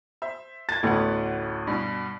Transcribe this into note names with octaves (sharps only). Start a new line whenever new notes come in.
C5 E5
G#6 A6
A1 D2 B3 G4 F#5
G2 B2